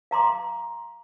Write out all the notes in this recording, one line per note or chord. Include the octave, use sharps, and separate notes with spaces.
F5 A#5 C6 D6